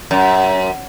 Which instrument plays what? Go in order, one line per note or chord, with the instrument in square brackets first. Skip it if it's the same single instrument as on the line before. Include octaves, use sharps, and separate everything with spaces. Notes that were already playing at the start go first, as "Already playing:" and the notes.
[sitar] F#2